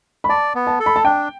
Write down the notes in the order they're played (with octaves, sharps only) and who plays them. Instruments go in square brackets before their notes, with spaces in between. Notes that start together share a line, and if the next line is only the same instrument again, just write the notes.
[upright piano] B5
[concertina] D5 [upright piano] A5
[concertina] B3
[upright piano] A5
[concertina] A4
[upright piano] B5
A5
[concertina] D4 [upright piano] G5